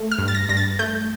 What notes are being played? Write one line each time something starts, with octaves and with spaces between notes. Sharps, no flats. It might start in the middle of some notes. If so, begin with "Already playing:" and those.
Already playing: A3
F6
G2
A6
A#6
G2 A#6
A6
A3 G6